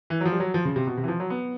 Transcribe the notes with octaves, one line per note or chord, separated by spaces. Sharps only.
E3
F#3
F3
G3
F#3
F3
C#3
C3
B2
C3
E3
F3
F#3
B3